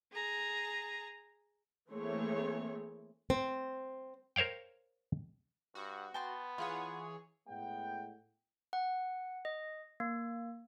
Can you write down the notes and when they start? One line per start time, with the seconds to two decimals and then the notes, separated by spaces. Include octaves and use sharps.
0.12 G#4 A#5
1.90 E3 A3 A#3 C4 G#4 C#5
3.30 C4
4.36 A#4 C5 C#5 F5 G5
5.75 G2 F#4
6.14 B3 G5 A5 C6
6.58 E3 F4 G#4 C#5 F#5
7.48 A2 G#3 B3 F#5 G5
8.73 F#5
9.45 D#5
10.00 A#3